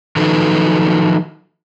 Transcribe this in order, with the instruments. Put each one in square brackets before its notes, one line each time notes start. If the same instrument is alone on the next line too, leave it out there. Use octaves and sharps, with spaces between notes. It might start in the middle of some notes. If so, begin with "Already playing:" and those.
[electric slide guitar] D#3 F3 F#3 D#4 A4 B4